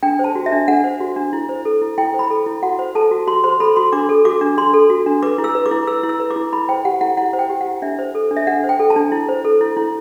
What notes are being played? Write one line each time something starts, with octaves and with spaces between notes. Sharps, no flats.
D4 G5
C5
A5
F#4
E5
D4
D4 F#5
C5
F#4
D4
E4
C5
A4
E4
E4 G5
C5
B5
A4
E4
F#4 F#5
C5
A4 A5
F#4
F#4 C6
C5 C6
A4 B5
F#4 C6
D4 D6
A4
F#4 D6
D4
D4 C6
A4
F#4
D4
B4 D6
E4
E6
B4
D6
E4
B4 E6
E4
E6
B4
D6
E4
E4 B5
C5 G5
G4 F#5
E4 F#5
E4 F#5
C5
G5
G4
F#5
E4
D4 E5
C5
A4
D4
E5
D4 F#5
C5
G5
A4
A5
D4
E4
C5
A4
E4
E4